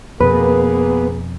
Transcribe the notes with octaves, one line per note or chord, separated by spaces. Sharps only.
F2 B2 A#3 B3 G#4 B4